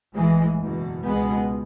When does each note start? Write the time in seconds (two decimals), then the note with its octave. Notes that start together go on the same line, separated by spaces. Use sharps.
0.14 B1 A2 E3 G#3
0.60 F#1 E2 B2
1.06 C#2 B2 G#3 B3